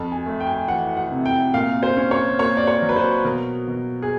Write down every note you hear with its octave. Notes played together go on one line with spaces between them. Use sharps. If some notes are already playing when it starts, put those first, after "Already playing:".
Already playing: F2 A5
G#5
A3
G5
G#5
G5
E3 F#5
F#5
C3
G5
A#2 F5
C5
C#4
C#5
A#3 C#5
D5
C#5
F#3
B4
C5
B2 A#4
B2
G#4